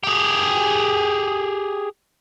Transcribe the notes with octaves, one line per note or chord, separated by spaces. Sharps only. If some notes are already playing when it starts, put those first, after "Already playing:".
G4 G#4